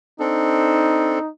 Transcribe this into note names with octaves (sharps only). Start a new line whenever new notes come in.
C4 D4 D#4 A4